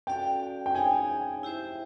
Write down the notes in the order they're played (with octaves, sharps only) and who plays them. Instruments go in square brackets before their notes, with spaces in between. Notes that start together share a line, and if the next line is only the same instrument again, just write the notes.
[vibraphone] C#4 F#4 A4 D5 F5 [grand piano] G5
[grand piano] G5
[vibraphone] D#4 G#4 C#5 F5 [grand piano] G#5
[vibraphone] E4 G4 C5 E5